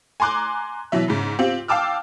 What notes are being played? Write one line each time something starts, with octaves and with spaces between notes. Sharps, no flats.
G#5 A#5 C6 D6 F#6
B2 E3 F#3 E5
G#2 C#3
C4 F4 G4
F5 G5 A5 D6 E6 F6